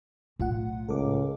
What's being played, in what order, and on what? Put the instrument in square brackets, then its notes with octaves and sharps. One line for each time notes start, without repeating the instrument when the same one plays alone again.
[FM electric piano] B1 F4 F#5 [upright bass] A2
[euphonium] C#2 [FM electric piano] A4 A#4 D6